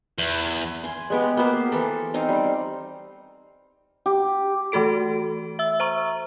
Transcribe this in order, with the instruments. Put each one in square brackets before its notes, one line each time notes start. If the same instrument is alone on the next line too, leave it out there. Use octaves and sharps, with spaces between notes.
[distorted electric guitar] E2
[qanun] G#5 C6
G#3 B3 G4
A#3 B3 G4 C5
E3 A4
C4 D#4 F5
G3
[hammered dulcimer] G4
[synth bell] E3 A3 F#4 A4 D7
E5 E6
C5 E5 A#5 C#6